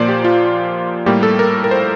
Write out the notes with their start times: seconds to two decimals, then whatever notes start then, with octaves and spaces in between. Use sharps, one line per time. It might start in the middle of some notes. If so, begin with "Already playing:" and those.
Already playing: A#2 F3 A#3 C5 D5
0.08 G4
0.25 F4
1.06 A2 G3 A#3 G4
1.23 A4
1.39 A#4
1.64 A#4
1.71 C5